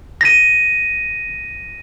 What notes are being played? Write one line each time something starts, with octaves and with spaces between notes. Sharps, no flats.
A#6 D#7